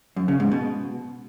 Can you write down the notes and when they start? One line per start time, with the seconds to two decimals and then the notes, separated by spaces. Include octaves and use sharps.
0.16 F#2
0.28 C#3
0.40 G#2
0.52 B2